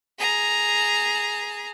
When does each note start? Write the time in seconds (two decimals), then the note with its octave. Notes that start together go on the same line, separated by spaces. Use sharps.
0.19 G#4 A#5